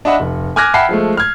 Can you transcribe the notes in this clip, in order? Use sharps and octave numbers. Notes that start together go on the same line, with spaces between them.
D4 D#5 E5 F#5 B5
F1
G#5 D6 F6 F#6 G#6 A#6
E5 F#5 G5 A5 B5 C7
F3 G#3 A3
F6 G#6